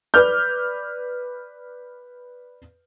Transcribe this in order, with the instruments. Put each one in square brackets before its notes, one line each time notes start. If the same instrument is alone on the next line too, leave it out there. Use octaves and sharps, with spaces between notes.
[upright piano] B4 D5 D6 F6 G6